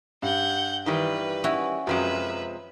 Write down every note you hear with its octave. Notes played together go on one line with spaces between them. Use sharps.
G2 F#5 G6
D#3 E3 G3 B4
C#4 E4 F#4
F#2 C3 F3 G#3 B4 E5